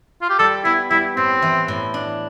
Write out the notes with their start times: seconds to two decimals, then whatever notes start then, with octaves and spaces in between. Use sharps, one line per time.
0.22 F4
0.30 G4
0.39 G3 A4
0.64 B3 E4
0.90 G3 E4
1.17 A2 C4
1.42 E3
1.68 A2
1.94 D4